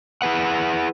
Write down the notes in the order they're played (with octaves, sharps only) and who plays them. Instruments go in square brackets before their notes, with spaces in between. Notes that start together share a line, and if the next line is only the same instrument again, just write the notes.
[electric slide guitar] E4 G#4 B4 F#5